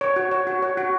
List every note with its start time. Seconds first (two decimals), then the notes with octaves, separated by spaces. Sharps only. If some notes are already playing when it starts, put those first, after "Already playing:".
0.01 C#5
0.16 F#4
0.31 C#5
0.47 F#4
0.62 C#5
0.77 F#4